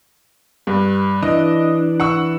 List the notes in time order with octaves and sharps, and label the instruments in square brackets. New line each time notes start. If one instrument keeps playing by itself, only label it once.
[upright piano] G2
[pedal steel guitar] E3 D4 [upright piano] D#5
[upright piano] F#5 C#6 E6